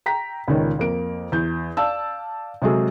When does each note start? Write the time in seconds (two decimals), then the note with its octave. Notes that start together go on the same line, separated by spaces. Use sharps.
0.06 G5 A#5 B6
0.48 C#2 A#2 D#3 C#5
0.79 F2 A#3 D7
1.32 E2 G6
1.77 D5 F5 A5 E6
2.62 C3 F#3 G#3 F#4 G#4 A4